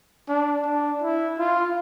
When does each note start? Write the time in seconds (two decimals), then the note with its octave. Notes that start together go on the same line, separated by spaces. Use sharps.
0.29 D4
0.66 D4
1.02 E4
1.39 F4